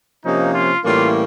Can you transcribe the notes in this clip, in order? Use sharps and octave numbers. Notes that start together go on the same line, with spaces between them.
C3 F3 A#3 C#4 D#4
F4
A2 E3 G3 A#3 C#4 F4